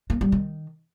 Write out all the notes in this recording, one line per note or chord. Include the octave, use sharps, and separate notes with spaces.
A#3
G3
D#3